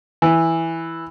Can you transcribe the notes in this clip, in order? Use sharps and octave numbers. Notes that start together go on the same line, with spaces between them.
E3